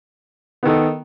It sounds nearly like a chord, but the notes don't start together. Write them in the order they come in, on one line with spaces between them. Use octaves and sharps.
B3 D#3 A4